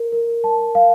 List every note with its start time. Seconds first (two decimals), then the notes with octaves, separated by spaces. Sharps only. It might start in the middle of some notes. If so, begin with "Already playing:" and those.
Already playing: A#4
0.12 A#4
0.44 A5
0.75 F5